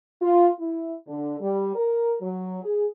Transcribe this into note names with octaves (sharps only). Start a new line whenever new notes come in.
F4
E4
D3
G3
A#4
F#3
G#4